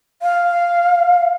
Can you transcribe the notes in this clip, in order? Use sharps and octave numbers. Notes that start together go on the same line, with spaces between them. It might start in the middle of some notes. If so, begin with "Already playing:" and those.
F5